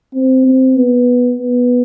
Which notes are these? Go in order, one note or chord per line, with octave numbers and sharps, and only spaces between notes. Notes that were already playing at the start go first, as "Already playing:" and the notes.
C4
C4
B3
B3